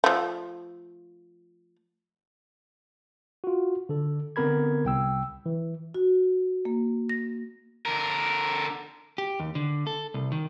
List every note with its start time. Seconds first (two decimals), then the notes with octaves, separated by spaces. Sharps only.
0.04 F3 A3
3.44 F4 F#4
3.89 D3 A4
4.36 D3 B3 C4 A#4 B5 G#6
4.85 C2 G5 E6
5.46 E3
5.95 F#4
6.65 A#3
7.09 A#6
7.86 D3 A#4
9.18 G4
9.40 D#2
9.55 D3
9.87 A4
10.14 C2
10.32 D#3